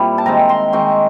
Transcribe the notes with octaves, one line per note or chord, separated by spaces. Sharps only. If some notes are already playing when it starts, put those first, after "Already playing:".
Already playing: A#2 G3 C4 E4
A5
D#3 G#3 C4 A#5
C6
D#3 G#3 C4 C#6